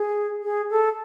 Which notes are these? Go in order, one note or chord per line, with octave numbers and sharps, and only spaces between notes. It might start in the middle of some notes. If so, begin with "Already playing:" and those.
Already playing: G#4
G#4
A4